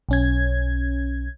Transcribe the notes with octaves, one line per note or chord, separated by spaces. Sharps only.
B1 C#4 G#6